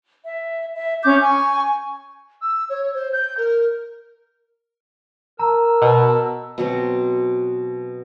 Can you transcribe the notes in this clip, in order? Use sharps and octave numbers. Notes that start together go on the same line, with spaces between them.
E5
E5
C#4 D6 G6
G#5 C#6
E6
C#5
C5
G6
A#4
A#4 A5 A#5 E6
B2
B2 F#3 C4